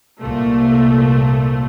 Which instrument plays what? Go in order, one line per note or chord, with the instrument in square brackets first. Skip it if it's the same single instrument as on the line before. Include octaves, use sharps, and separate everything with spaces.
[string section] C2 A#2 A3